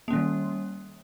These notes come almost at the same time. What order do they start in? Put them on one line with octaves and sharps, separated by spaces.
A#3 C#4 D#3 G3